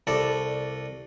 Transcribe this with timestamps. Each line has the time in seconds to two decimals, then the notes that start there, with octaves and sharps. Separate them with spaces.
0.07 C2 A4 D5